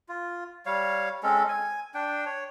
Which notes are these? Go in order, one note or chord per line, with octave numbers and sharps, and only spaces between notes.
F4
G3 C#5 F5
G#3 C4 C#4 A4
G#5
D4 G5
C#5